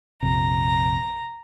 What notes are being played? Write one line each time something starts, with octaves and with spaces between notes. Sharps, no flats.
A#1 F2 C3 A#5